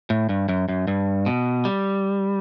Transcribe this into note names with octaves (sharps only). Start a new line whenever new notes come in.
A2
G2
F#2
F#2
G2
B2
G3